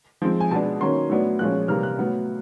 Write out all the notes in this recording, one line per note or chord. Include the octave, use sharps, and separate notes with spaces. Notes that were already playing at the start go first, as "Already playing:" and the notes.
F3 G#3 C4
G#5
B2 G#3 B3 D4 A5
D#3 F#3 A#3 C#4 C6
A2 F#3 B3 D4
A#2 F3 G#3 C#4 F#6
C3 E3 G3 A#3 F6
F#6
A2 F#3 B3